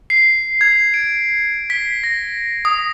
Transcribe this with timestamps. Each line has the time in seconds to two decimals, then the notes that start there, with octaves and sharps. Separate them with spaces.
0.10 C7
0.61 G#6
0.94 D7
1.70 B6
2.04 A#6
2.65 D#6